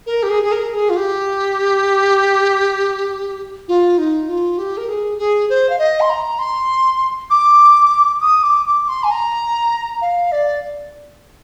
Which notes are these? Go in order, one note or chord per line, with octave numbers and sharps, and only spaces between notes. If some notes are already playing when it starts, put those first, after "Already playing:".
A#4
G4
G#4
G#4
A#4
G#4
F4
G4
F4
D#4
F4
G4
A#4
G#4
G#4
C5
F5
D#5
C6
A#5
C6
D6
D#6
D6
D6
C6
G#5
A#5
F5
D5